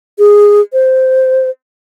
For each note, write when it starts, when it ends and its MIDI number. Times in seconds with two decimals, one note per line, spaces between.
0.19 0.61 68
0.73 1.50 72